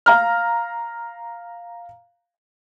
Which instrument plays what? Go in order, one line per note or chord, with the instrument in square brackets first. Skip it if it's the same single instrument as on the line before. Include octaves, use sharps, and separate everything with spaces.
[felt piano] F5 A#5 F6